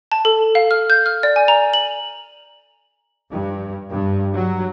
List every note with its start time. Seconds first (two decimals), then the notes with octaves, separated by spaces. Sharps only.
0.12 A5
0.25 A4
0.55 F5
0.71 F6
0.90 G6
1.06 F6
1.23 D5
1.36 G#5
1.48 A#5
1.73 F#7
3.30 G2
3.91 G2
4.34 F#3